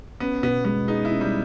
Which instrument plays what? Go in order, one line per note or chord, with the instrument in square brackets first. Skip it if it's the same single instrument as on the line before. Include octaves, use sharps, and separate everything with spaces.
[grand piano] B3 [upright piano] C#4
[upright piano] B2 [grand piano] B3
[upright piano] G#3 [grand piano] B3
[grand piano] D#4 [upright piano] G#4
[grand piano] E4
[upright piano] C#4
[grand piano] G3